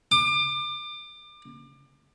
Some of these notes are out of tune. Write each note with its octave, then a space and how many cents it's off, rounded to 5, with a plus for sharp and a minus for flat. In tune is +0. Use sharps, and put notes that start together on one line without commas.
D6 +30